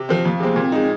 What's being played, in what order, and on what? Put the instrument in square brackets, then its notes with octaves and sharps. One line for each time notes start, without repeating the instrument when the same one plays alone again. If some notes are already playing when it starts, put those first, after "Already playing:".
Already playing: [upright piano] C3
F3 C4
[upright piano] F2 [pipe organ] A#3
[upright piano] C3 G#3 C4
[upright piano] A#2 [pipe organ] C4
[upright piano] G#3 D#4